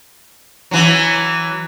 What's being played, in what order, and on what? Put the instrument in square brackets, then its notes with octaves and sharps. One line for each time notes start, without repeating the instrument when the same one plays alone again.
[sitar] E3 F#3